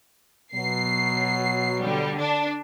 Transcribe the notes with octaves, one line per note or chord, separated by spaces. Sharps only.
B2 F#3 C7
D3 G3
D4